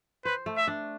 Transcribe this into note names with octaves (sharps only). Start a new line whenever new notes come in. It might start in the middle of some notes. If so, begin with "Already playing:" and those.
B4 C5
A3
E5
D4